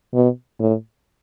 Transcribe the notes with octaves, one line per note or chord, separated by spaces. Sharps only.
B2
A2